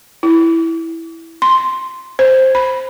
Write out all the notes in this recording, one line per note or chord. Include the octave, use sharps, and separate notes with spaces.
E4
C6
C5
B5